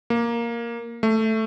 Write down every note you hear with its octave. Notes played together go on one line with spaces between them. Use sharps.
A#3
A3